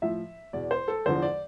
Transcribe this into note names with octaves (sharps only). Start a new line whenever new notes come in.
A2 F3 E5
E2 B2 D5
C5
A4
E2 D3 F3 C5
D5